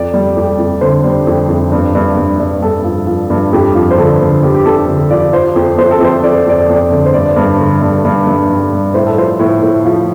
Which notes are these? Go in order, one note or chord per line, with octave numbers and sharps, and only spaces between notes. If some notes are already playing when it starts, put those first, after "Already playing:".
Already playing: F2 D5
G3
F2
F2
D3 C5
G3
F2
F2
G2
G2
G2
G2
G2 A4
F3
F3
G2
F2 G4
F3
C5
D3 A4
D3
D3 G4
G4
F2 A4
D3
F3 D5
F3 C5
F2
F2 C5
A4
F2 C5
F2 D5
F2 D5
F2
D5
D3
C5
G2 D5
G2
D3
G2
G2
G2
G3
G3
A2 C5
A4
F3 C5
A2
A2
F3